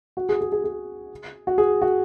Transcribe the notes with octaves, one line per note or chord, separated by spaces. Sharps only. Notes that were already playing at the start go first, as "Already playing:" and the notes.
F#4
G#4
G#4
G#4
G#4
F#4
G#4
F#4